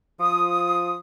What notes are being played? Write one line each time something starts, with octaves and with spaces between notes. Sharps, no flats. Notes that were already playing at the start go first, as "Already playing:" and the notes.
F3 D#6